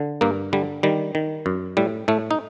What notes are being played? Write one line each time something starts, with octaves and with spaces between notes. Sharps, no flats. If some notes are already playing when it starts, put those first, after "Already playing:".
Already playing: D3
G2 A#3
D3 G3
D#3 G3
D#3
F#2
A2 G3
A2 A3
D#4